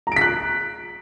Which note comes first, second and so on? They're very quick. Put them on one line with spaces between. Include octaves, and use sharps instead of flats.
A#5 D7 B6 F#6